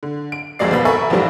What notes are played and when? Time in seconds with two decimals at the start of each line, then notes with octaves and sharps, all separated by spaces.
0.03 D3
0.32 D7
0.59 F#1 F2 F#3 G#3 D5 C7
0.71 D#2 B2 B3 B5 A6
0.85 A4 A#4 E5 G#5 B5 C#6
1.10 A1 D#2 G#2 F3 G3